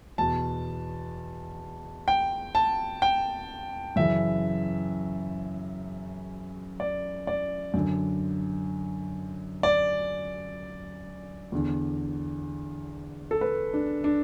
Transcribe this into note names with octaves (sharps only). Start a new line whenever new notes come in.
E2 B2 A5
G5
A5
G5
F#2 C#3 E3 E5
D5
D5
F#2 D3
D5
E2 D3
A4
B4
D4
D4